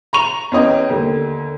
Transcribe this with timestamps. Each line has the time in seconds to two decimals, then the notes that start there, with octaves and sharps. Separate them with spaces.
0.13 A#5 C#6 F7
0.52 E2 C#4 D#5 G5
0.89 D#2 D3